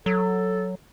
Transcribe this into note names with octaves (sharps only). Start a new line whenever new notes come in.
F#3 A4